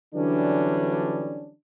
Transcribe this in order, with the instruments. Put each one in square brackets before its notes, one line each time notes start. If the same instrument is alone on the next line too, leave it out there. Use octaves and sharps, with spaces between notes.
[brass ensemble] D3 E3 F#3 G3 C#4 D4